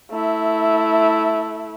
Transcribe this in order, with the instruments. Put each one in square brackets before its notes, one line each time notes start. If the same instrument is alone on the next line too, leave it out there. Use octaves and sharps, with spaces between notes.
[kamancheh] A3 E4